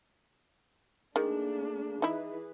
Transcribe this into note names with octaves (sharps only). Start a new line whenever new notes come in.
D#3 A3 A#3 D4 G#4
E3 D#4 E4 G#4 B4